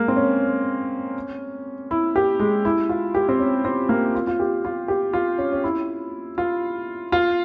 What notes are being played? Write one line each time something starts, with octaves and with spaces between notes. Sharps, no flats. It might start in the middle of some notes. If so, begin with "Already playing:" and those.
Already playing: G#3 A#3
C4
C#4
E4
G4
G#3
E4
F4
G4
C4
C#4
C4
A#3
F4
F4
G4
F4
G4
F4
C#4
C#4
E4
F4
F4